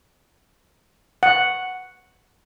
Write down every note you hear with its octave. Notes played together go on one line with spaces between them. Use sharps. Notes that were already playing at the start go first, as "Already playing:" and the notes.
F#5